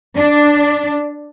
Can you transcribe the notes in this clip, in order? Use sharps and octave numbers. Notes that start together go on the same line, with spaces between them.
D4